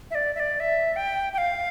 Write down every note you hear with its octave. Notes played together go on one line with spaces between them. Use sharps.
E5
D5
E5
D5
E5
G5
G5
F5